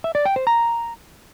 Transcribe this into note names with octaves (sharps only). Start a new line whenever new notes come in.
E5
D5
G5
C5
A#5